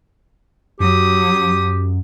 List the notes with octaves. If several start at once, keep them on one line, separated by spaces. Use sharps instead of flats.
F#2 F#3 G4 D#6